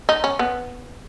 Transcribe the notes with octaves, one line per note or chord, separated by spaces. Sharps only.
D#4
C#4
B3